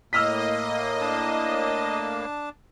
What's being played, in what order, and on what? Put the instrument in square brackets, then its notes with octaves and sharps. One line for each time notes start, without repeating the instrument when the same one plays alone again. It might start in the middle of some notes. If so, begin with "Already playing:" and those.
[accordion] A2 A#3 [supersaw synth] D#5 [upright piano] E6 F6 B6
[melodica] D4 A5